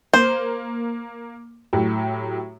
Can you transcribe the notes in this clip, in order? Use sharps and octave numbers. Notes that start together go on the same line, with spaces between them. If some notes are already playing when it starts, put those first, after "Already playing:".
A#3 C5
A2 F#3 G4